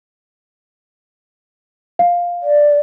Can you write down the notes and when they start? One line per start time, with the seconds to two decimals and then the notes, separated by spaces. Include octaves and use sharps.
1.99 F5
2.42 D5